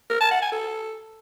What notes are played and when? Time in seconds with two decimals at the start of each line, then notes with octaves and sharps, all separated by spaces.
0.10 A#4
0.21 A5
0.31 F#5
0.42 G#5
0.52 A4